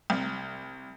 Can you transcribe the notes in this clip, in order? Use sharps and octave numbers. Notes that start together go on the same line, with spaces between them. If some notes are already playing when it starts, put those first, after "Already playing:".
C2